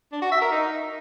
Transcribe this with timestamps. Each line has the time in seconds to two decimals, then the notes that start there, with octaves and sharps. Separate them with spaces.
0.12 D4
0.22 F#4
0.32 E5
0.42 A#4
0.52 D#4